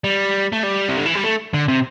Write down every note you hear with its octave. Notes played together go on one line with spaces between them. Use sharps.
G3
A3
G3
C3
D3
E3
G3
A3
D3
C3